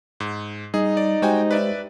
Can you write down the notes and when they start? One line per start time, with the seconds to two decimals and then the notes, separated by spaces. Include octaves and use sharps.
0.20 G#2
0.74 G3 D#4 G#4
0.97 D5
1.22 G#3 F#4 G4 C5 G5 G#5
1.51 B4 D5 E5